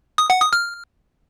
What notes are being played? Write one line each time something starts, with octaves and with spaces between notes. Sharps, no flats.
D#6
F#5
D#6
F6